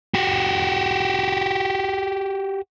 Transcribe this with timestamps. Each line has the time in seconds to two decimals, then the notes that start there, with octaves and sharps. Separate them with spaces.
0.14 F#4 G4